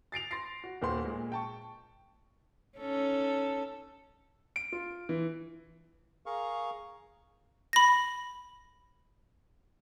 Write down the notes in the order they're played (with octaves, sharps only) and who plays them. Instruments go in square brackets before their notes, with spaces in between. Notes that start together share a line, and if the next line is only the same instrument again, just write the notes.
[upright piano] A6 C7 D7 F7
C6 A6 A#6 C7
F#4
D#1 D#2 F#4 C5 C6
A#2 G#3
G5 A5 C#6
[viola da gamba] C#4 D#4 A4
[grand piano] D7
F4
E3
[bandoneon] G#4 A#4 F5 C#6
[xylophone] B5 A#6